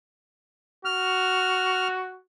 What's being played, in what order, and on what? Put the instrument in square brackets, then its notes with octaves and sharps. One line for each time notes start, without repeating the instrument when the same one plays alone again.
[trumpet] F#4 [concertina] F6